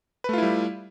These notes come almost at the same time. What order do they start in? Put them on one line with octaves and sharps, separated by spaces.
B4 A3 F4 E4 G3